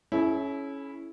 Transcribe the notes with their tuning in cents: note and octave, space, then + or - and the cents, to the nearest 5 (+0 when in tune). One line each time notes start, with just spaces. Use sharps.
C#4 +0 E4 -10 G#4 +45